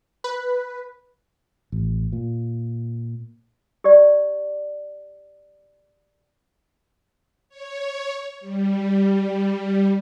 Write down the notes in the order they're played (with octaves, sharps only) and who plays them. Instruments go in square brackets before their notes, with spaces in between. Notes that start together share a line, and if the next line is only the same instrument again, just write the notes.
[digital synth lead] B4
[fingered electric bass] A1
A#2
[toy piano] G4 D5
[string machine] C#5
G3